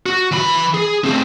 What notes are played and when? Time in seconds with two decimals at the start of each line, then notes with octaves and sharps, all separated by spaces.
0.06 F#4
0.31 E3 B5
0.74 G#4
1.04 A3 C4